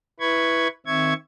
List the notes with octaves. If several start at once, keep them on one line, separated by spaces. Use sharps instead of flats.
E4 B4 B5 C#6 G#6
D#3 C4 E5 C#6 G#6